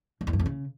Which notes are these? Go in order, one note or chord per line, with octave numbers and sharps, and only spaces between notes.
G2
E2
G2
F2
C#3